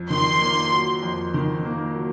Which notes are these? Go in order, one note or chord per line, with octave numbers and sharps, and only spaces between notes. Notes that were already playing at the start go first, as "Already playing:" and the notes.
Already playing: F2
D#3 C6
A#3
F#3
F2
D#3
A#3
F#3